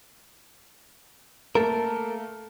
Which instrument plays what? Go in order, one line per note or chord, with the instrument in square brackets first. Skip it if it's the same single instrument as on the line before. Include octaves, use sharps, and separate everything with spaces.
[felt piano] A3 A#3 [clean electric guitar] A4 A#4